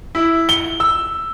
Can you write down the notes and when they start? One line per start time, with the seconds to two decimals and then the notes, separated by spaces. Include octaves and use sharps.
0.15 E4
0.49 G7
0.80 E6